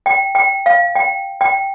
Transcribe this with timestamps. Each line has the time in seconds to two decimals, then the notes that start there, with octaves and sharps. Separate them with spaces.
0.06 G5
0.35 G5
0.66 F5
0.95 G5
1.41 G5